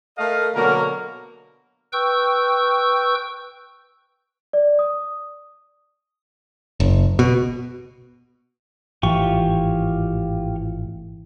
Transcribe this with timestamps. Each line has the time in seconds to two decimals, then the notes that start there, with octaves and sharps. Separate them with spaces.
0.18 A3 A4 A#4 D#5 F5
0.55 B2 D3 F#3 A#3 F#4 A#4
1.93 B4 G5 C#6 E6 G6
4.53 D5
4.79 D#6
6.80 F#1
7.19 B2
9.03 G#1 A2 E3 F4 G4 C#6